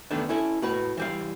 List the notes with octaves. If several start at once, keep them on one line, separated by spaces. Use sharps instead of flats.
E2 D3 D#3 A3 B3 D4
C#4 E4 A4
A2 F#4 B4
E3 G3 F5